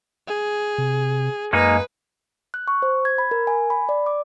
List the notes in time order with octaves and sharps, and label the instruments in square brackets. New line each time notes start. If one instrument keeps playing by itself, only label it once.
[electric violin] G#4
[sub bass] C3
[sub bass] F#2 [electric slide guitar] G#3 A#3 D#4 [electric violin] B4
[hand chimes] F#6
C#6
C5
G#6
B5
A#4
G#5
B5
D5
D6